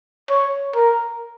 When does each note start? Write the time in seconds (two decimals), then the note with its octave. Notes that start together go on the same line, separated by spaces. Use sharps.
0.30 C#5
0.75 A#4